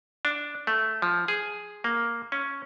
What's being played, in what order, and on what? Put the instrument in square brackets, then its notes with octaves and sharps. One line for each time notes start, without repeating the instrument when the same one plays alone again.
[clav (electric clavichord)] D4
A3
F3
G#4
A#3
C#4